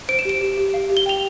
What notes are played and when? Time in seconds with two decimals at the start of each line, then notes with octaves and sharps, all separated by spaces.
0.09 C5 D7
0.19 E7
0.25 G4 D7
0.41 G4
0.57 G4
0.74 F5
0.90 G4
0.97 G7
1.06 G5 F7